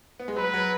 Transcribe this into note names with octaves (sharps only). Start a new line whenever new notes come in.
B3
G#3
F#3 B4
F#3